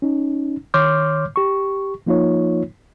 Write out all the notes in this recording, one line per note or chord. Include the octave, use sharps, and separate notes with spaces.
C#4 D#4
D#3 C#5 C6 D6 F6 G6
G4 C#6
F3 A#3 D#4 F4 C#5